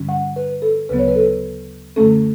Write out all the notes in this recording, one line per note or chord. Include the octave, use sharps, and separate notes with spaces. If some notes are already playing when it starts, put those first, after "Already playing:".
Already playing: G2 D3 G3 C#4
F#5
B4
A4
D2 C#3 F#3 B3 B4
C#5
B4
A4
F#2 D3 A3 C#4 A4